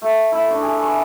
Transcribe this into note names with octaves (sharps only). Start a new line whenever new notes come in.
A3
E4
D4 C#6
G#4
C#6